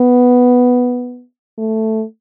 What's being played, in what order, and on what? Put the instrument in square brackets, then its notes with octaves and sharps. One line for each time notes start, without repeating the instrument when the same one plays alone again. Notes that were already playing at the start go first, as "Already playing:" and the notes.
Already playing: [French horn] B3
A3